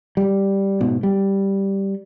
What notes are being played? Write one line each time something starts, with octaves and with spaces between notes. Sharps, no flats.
G3
G#2 B2
G3